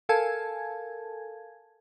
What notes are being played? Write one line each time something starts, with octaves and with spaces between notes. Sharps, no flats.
A4 A#4 F5 G#5 A5 G#6